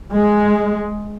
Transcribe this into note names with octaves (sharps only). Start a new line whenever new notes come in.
G#3